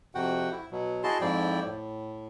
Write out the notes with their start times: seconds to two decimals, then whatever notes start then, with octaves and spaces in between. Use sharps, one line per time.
0.15 F2 C3 F#4 F#5 G5
0.52 E4
0.71 B2 F#3
1.04 E4 F#4 G#4 D#5 A5 C6
1.21 F2 G#2 F3 E4 D5 G5
1.65 A2